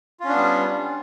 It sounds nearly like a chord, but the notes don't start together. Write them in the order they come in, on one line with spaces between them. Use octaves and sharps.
F4 C#4 D4 B3 G3